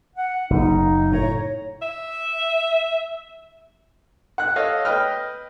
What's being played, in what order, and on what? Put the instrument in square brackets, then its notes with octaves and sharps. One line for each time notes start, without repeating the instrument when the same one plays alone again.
[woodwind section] F#5
[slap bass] F#1 [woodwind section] D#4
[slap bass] A2 [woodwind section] C#5 A#5
[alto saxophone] E5
[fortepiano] F#5 F#6
A4 C#5 D#5 F5
B4 D#5 G5 F6